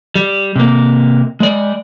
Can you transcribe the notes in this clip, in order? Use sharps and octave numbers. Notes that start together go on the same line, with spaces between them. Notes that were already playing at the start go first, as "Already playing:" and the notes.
G3
C3 A#3
G#3 D5